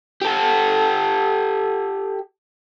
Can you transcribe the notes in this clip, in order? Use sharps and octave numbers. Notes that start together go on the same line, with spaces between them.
G4 A4